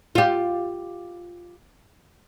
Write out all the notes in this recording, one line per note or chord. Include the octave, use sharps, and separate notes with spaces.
F4 G4